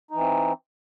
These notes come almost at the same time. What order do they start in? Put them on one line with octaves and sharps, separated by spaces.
D#4 E3 C4